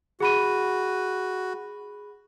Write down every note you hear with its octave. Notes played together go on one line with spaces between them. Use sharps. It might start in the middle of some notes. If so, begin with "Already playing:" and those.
F#4 G#4 B5 D#7